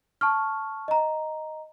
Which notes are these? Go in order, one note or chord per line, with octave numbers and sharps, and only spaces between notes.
A5 C#6 F6
D#5 A#5